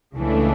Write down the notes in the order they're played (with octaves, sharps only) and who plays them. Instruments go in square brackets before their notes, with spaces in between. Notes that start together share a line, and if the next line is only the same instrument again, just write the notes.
[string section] C#2 C#3 E3 A3 D4